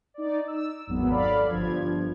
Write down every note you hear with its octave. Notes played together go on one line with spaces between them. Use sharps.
D#4 D5
E6
G#1 E2 F#3 B3
A4 D5 F5 B5
G1 G2 F3 G#6